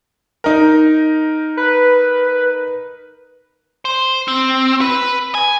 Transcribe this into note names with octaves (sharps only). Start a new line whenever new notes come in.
D#4 A#4
B4
C5
C4
B4
G#5